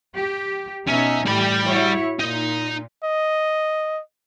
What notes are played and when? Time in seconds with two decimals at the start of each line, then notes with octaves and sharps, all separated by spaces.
0.15 G4
0.88 B2 C#4 D#4 E5
1.26 A2 E3 G3 G4 B5
1.65 E4 F#4 C#5
2.20 A#2 D#4
3.04 D#5